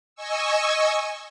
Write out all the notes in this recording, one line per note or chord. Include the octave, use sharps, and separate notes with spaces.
D#5 G#5 C#6 E6